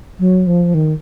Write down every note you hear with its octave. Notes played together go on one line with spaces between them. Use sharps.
F#3
F3
D#3